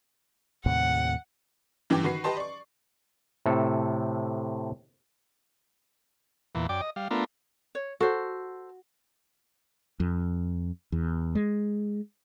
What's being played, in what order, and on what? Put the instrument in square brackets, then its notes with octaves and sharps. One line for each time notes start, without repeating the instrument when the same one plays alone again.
[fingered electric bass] D#2 A2 C3 [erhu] F#5
[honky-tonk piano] G2 E3 B3 C#4 G5 D6
D#3 F#4 B4 C7
G4 B4 D#5 A5 C6
D5 C#6
[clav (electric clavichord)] A2 C3 A4
[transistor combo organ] E2 A#2 E3
F#2 D5 G5 D6
D#5
G3 F5
A3 B3 D4 F4 A#4
[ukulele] C#5
[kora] F#4 [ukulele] A4 C5
[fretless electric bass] F2
E2
G#3